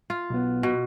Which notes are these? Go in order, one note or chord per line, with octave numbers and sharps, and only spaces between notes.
F4
B1 B3
B2